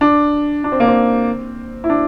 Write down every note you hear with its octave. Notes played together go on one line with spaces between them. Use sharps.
D4
D4
C4
A#3
C4
E4
D4